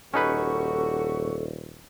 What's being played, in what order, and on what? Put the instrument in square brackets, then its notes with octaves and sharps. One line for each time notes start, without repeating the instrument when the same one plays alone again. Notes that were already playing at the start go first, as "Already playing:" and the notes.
[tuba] D#1 [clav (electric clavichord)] C#4 D#4 B4 [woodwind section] F#4 G4 C#6 [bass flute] A4